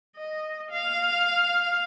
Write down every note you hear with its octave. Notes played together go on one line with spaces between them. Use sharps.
D#5
F5